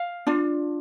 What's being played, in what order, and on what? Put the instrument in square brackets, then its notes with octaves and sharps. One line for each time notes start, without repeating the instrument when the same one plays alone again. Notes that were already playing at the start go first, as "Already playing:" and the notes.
Already playing: [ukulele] F5
D4 F4